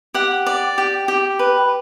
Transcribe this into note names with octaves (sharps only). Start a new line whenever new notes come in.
G4 F#5
D5
G4
G4
B4